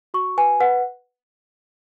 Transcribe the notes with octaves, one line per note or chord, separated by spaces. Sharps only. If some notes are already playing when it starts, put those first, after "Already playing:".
F#4 C#6
B4 G#5
B4 F#5